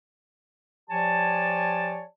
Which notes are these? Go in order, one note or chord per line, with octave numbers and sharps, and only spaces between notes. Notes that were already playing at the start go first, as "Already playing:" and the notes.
F3 G4 C#5 D5 G#5 A5